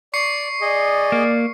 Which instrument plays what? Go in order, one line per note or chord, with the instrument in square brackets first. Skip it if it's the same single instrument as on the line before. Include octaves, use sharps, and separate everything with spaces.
[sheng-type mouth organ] D5 [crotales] C#6 C7 C#7
[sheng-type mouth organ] G#4 D#5 [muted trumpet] D5
[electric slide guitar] A#3